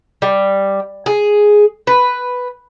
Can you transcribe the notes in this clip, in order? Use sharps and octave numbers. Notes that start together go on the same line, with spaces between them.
G3
G#4
B4